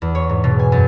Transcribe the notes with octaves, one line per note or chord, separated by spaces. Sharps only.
E2
C#5
G#2
B2
G#5
F#2